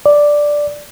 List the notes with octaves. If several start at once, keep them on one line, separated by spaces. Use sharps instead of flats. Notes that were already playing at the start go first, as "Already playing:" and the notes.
D5